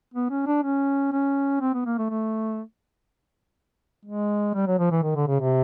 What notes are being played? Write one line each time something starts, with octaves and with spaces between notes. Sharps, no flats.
B3
C#4
D4
C#4
C#4
C4
B3
A#3
A3
A3
G#3
G3
F#3
F3
E3
D#3
D3
C#3
C3